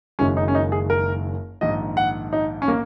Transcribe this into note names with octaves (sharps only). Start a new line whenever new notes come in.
F#1 F#2 D#3 G#3 C#4
D#4
C#4
D#4
G#4
A#4
A#1 G#2 D#3 D#5
F#5
D#4
C#4
A#3